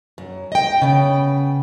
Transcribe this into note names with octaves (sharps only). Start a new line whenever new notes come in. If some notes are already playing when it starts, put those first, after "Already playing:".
F#2
D#5 G5
C#3 B3